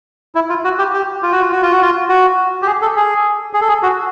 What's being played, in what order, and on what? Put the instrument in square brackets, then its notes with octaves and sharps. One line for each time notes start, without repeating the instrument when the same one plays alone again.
[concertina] E4
F4
F#4
G4
G4
F4
F#4
F4
F#4
F4
F#4
F4
F#4
G4
G#4
A4
G#4
G#4
A4
G#4
F#4